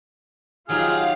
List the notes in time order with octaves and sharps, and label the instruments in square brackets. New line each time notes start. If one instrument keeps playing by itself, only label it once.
[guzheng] D#3 F#3 G4 [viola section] F4 [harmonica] G#4 F6 [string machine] F5